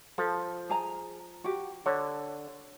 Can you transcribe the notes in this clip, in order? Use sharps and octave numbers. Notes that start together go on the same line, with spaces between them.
F3 A4
G#4 G#5 A#5
F#4 G4
D3 C#5